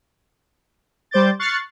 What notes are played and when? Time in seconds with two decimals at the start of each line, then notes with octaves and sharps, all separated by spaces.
1.11 G3 C5 D6 G6 A6
1.39 C#6 F6 F#6 A6 C7 C#7